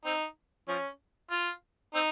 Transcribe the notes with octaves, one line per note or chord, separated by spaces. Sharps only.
C4 D#4
F3 C#4
F4
C4 D#4